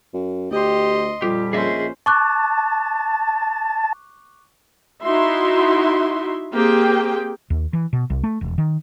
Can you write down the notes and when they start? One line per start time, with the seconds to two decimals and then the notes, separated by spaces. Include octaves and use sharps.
0.14 F#2
0.51 D2 G4 D#5 C6
1.22 F2 A#2 F3 G3 G4
1.53 A#1 C#4 G#4 C5 D#5 E5
2.06 A5 C#6 D6 F#6
5.02 D#4 E4 F#4 E5 C6
6.52 A#3 C4 G4 G#4 G5
7.50 D#2
7.73 E3
7.93 B2
8.10 C2
8.24 A3
8.41 E1
8.58 D#3